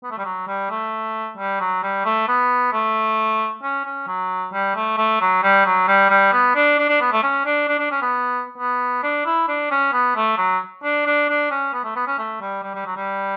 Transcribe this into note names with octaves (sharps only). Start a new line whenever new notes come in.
B3
A3
G3
F#3
G3
A3
G3
F#3
G3
A3
B3
A3
C#4
C#4
F#3
G3
A3
A3
F#3
G3
F#3
G3
G3
B3
D4
D4
D4
B3
A3
C#4
D4
D4
D4
C#4
B3
B3
D4
E4
D4
C#4
B3
A3
F#3
D4
D4
D4
C#4
B3
A3
B3
C#4
A3
G3
G3
G3
F#3
G3